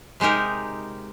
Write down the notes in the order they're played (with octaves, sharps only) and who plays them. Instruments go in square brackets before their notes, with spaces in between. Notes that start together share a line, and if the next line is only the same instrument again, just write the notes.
[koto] C3 G#3 D#4 G4 A#4